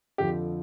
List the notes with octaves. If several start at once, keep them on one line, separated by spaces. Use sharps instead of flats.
F2 D3 F3 G4